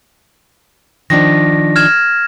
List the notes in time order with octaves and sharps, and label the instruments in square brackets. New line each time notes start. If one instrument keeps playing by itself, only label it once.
[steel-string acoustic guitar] D#3 F3 D4 [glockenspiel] A#6
[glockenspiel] F6 G#6 E7